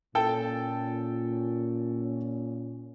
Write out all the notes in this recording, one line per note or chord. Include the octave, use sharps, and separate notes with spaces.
A#2 C#4 A4 G5